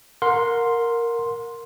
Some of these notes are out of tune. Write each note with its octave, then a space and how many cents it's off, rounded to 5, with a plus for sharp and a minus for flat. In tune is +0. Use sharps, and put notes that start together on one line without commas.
A#4 +0 F#5 -35 C6 +0